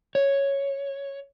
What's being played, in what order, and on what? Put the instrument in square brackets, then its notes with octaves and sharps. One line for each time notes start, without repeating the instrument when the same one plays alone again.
[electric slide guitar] C#5